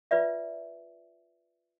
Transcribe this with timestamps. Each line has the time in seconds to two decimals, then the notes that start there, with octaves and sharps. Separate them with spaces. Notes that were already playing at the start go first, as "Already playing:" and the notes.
0.11 F4 B4 D5 E5